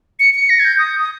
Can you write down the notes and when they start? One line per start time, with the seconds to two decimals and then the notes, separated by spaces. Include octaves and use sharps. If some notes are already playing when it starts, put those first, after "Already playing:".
0.20 C#7
0.34 C#7
0.50 A#6
0.59 G#6
0.65 G6
0.79 D#6
0.99 D#6